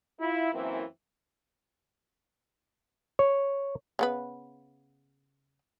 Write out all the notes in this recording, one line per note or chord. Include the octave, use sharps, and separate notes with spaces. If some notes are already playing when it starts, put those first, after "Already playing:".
E4 F4
F#2 E3 A#3 C4 E4
C#5
C#3 B3 B4